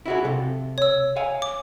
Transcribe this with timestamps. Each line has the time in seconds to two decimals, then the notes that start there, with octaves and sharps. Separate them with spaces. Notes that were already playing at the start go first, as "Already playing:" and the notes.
0.06 E4 F#4 G#4
0.25 C3 A4
0.78 C#5 E6
1.16 F5 G#5
1.42 D6